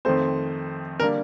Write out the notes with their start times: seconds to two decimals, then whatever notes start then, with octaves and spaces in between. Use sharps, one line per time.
0.05 F2 D#3 A3 C4 C5
1.00 D3 G3 A#3 D4 A#4